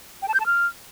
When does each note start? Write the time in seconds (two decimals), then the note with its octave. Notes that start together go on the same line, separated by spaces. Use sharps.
0.22 G5
0.28 A5
0.34 G6
0.40 A5
0.46 F6